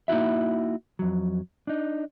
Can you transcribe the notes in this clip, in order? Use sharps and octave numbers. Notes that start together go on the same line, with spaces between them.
A#3 D#4 E4 F#4 E5
F2 F#3
D4 D#4